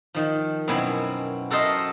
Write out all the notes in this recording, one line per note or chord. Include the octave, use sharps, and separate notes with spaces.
D#3 F3
F#2 B2 C4 E4 F#4 G#5
F#4 A4 A#4 C5 D#5 E5